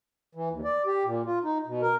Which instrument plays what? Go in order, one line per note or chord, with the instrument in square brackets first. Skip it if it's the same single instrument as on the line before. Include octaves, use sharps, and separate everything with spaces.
[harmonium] E3
D#2
D5
G4
A#2
F4
D#4
B2
A#4